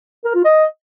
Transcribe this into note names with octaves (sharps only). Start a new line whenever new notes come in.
A#4
F4
D#5